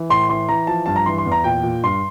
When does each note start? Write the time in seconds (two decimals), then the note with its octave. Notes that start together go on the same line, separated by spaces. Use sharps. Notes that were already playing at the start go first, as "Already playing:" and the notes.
Already playing: E3
0.09 A2 C6
0.29 E3 C6
0.49 E3 A#5
0.67 F3 A5
0.86 G2 A5
0.96 A#5
1.06 E3 C6
1.18 C6
1.26 E2
1.32 A#5
1.44 A#2 G5
1.63 A#2
1.83 G2 C6